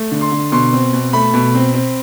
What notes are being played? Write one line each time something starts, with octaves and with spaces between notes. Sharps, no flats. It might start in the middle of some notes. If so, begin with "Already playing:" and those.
Already playing: A3
D3
C6
D3
B2 C6
C4
B2
A3 B5
B2
C4
C4